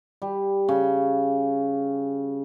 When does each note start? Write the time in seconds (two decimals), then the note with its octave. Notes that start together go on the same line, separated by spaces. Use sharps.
0.22 G3
0.69 C#3